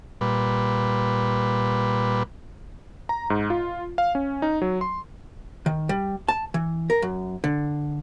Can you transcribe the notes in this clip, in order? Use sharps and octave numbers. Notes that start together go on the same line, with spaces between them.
A#2 G3 B4
A#5
G#2
F4
F5
C#4
D#4
F#3
C6
D#3
G3
A5
E3
A#4
F#2
D3